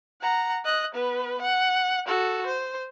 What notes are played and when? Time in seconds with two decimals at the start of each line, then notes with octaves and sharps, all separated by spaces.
0.21 F#5 A#5
0.65 D#5 F#6
0.94 B3 B4
1.41 F#5
2.07 F#4 A4
2.46 C5